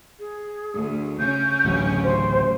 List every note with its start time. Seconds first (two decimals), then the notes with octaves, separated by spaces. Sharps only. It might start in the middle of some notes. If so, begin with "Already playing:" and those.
0.19 G#4
0.74 D2
1.19 C#3 C#4 G6
1.65 A1 D2 F#3
2.03 C5